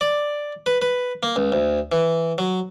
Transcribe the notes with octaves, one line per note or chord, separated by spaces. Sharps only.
D5
B4
B4
A#3
C#2
D2
E3
F#3